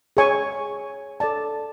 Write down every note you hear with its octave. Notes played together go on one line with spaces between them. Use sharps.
G#4 C#5 G#5 C#6
A4 D5 A5